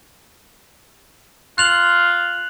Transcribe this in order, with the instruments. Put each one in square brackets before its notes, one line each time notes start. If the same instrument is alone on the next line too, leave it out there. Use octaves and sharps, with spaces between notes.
[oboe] F4 [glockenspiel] F#6 F7 F#7